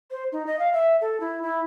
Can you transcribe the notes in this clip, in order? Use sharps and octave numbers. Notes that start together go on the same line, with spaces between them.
C5
D#4
D#5
F5
E5
A4
E4
E4